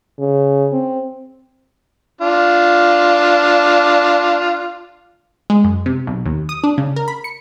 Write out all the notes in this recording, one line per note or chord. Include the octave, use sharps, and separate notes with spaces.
C#3
C4
D4 F4
G#3
F#2
C3
B1
D#2
D#6
D4
C#3
A#4
B5
C#7